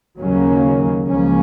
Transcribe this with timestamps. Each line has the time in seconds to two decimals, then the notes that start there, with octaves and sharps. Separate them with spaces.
0.19 D#2 C#3 F#3 A#3 C#4
1.04 C#2 C#3 F3 A#3 C#4